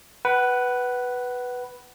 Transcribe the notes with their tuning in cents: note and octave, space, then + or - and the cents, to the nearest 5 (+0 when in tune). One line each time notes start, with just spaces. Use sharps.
B4 +0 F#5 +25